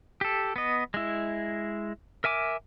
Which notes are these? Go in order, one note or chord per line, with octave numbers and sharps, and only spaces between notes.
G4 A4
B3 D#5
G#3 E4
A#4 E5 G#5 D6